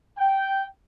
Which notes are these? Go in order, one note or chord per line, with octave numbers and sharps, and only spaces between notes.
G5